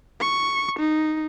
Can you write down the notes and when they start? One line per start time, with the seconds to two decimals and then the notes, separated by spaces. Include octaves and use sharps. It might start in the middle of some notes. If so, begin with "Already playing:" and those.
0.21 C#6
0.79 D#4